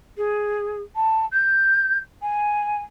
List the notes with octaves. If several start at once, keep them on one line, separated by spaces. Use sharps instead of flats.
G#4
A5
G6
G#5